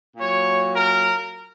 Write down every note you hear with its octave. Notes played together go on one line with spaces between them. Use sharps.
A#2 F#3 C#5
A#4